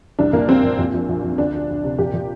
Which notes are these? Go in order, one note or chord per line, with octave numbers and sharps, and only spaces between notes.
C2 D4
A#2 A#3
C2 C4
A#2
A#2
A#1
A#1
A#1
D2 D4
D2
D2
C3
A#2 G4
A#2